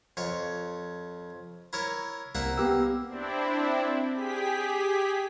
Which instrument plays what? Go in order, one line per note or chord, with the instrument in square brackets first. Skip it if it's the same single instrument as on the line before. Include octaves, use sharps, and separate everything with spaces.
[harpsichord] F2 C#5
E4 A#4 C#5
[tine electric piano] C2 [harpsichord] A#3 E5 F#5
[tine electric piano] B3 G4 E6
[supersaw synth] C4 D4 E4
G4 G#4 B6